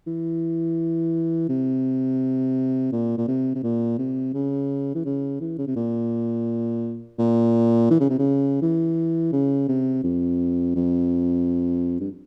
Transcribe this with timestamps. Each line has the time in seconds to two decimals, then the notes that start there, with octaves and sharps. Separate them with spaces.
0.07 E3
1.49 C3
2.92 A#2
3.18 A#2
3.28 C3
3.55 C3
3.63 A#2
3.99 C3
4.34 C#3
4.95 E3
5.05 C#3
5.41 E3
5.58 C#3
5.67 C3
5.76 A#2
7.19 A#2
7.90 E3
8.00 C#3
8.10 C3
8.19 C#3
8.62 E3
9.33 C#3
9.68 C3
10.04 F2
10.75 F2
12.00 G2